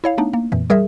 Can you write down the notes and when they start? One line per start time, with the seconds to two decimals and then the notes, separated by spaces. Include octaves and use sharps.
0.04 E4 C#5 F5
0.18 A3 B3 D4 D#4
0.33 A#3
0.52 F2 A#2 E3
0.70 G3 G#4 A#4 E5